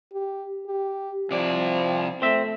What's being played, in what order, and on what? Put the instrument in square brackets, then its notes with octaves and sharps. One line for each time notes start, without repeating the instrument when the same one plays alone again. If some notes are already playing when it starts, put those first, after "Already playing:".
[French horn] G4
G4
[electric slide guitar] C3 D5 [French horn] F3
[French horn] A3 [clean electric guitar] C4 E5